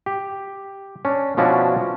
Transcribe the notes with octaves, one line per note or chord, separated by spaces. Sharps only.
G4
C#4 D4
B2 F3 C#4 D4 E4 F#4